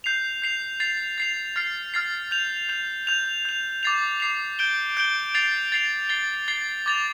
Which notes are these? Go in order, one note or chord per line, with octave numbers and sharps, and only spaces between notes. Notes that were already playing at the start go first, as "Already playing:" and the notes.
G6 C7 F7
G6 C7 F7
A6 C7 F7
A6 C7 F7
F6 A6 C7
F6 A6 C7
G6 F7
G6 F7
G6 F7
G6 F7
D6 A6 C7 F7
D6 A6 C7 F7
G6 D7 G7
G6 D7 G7
A6 C7 F7
A6 C7 F7
A6 C7 G7
A6 C7 G7
D6 A6 F7